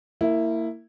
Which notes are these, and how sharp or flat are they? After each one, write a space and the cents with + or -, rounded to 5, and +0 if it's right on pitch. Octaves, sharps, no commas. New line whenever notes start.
A#3 -25 E4 +0